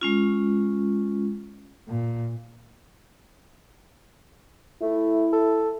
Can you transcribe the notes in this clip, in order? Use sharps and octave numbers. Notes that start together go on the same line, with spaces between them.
G#3 C#4 F4
A#2
A3 E4
A4